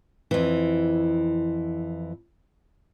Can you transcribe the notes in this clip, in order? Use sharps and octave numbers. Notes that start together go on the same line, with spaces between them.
F2 E3